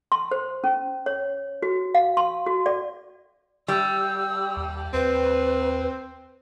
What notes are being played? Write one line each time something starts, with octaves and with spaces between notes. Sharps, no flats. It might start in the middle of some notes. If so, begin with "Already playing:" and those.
C6
C5
C#4
C#5
F#4
F5
C6
F#4
D5
G3 E6
D#2
D#2 C4 B4